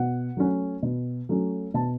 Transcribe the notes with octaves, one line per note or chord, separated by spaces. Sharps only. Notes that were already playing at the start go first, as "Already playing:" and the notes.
Already playing: B2 F#5
F#3 A3 C#4
B2
F#3 A3 C#4
B2 A5